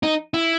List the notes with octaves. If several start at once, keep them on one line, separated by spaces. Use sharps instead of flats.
D#4
E4